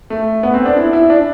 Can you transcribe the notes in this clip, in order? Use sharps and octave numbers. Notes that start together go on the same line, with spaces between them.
A3
B3
C4
D4
E4
E4
D4